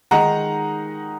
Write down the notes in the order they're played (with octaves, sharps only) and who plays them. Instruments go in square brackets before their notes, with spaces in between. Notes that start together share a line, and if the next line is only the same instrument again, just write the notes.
[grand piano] D#3 G#3 D#4 F#5 A#5